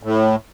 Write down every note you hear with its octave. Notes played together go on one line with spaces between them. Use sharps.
A2